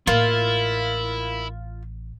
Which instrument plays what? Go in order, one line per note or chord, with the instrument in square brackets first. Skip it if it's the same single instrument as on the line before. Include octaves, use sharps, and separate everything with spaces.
[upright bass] A1 [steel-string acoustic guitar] A#3 [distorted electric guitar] E4 [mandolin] F4